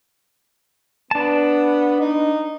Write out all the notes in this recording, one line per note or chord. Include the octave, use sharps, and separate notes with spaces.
B3 D4 A5
D#4